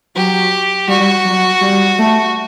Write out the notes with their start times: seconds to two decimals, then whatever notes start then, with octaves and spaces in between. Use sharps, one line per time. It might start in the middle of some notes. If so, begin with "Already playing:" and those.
0.16 F#3 G4
0.88 G3 F#4
1.25 F#3
1.62 G3
1.99 A3